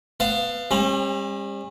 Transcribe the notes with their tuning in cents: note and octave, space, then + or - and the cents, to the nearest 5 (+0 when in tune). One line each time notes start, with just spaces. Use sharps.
B3 +0 F5 -15 A5 +20
G3 +35 C#4 -40